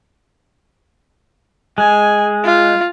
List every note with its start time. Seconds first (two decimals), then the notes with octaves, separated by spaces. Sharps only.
1.78 G#3 G#5
2.44 F4